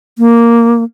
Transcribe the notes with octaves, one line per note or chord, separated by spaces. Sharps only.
A#3